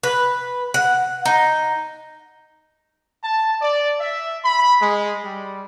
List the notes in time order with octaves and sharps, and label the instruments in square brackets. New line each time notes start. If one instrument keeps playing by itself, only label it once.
[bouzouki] B4
F#5
D#4
[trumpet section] A5
D5
E5
B5
G#3
G3